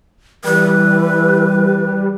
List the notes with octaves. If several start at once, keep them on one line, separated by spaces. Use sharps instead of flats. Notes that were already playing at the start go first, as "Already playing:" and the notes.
E3 G3 B4